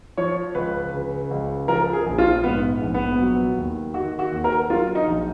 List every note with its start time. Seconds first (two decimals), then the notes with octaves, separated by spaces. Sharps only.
0.17 F3 C#5
0.55 C#2 B4
0.93 C#3
1.31 C#2
1.68 F3 A#4
1.93 G#4
2.06 A#1
2.18 F4
2.44 G#2 B3
2.82 A#1
2.94 B3
3.19 F#3
3.57 D#2
3.94 D#3 F#4
4.19 F#4
4.32 D#2
4.44 A#4
4.70 F#3 F4
4.95 D#4
5.07 A#1